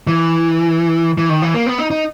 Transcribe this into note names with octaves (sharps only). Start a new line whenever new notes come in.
E3
E3
D#3
E3
A#3
B3
D#4
D#4